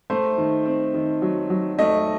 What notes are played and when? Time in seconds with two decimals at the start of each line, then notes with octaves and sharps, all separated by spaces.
0.10 A3 C5
0.38 D#3
0.66 C4
0.94 D#3
1.22 F#3
1.50 F#3
1.79 A3 D#5